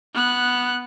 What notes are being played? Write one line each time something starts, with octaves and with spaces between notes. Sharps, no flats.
B3 F#6